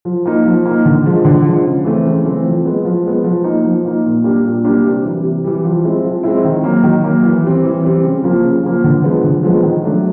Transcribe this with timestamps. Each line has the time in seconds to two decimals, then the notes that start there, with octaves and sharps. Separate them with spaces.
0.05 F3
0.26 A#3 D#4
0.45 F3
0.65 A#3 D#4
0.85 D3
1.06 F3 G#3
1.25 D3
1.45 F3 G#3
1.64 C#3
1.84 E3 A3 C4
2.05 C#3
2.25 E3 A3 C4
2.45 F3
2.65 G#3 B3
2.85 F3
3.05 G#3 B3
3.24 F3
3.44 A#3 D#4
3.65 F3
3.85 A#3 D#4
4.05 A#2
4.24 G3 A#3 D4
4.44 A#2
4.65 G3 A#3 D4
4.84 C3
5.04 E3 G3
5.24 C3
5.44 E3 G3
5.64 F3
5.84 G#3 C4 E4
6.04 F3
6.23 G#3 C4 E4
6.44 D#3
6.64 F#3 A#3
6.83 D#3
7.04 F#3 A#3
7.23 E3
7.44 G3 C4
7.64 E3
7.84 G3 C4
8.03 C#3
8.24 F3 A#3
8.43 C#3
8.63 F3 A#3
8.84 D3
9.04 F3 G#3 B3
9.24 D3
9.43 F3 G#3 B3
9.63 D#3
9.83 F#3 A3 D4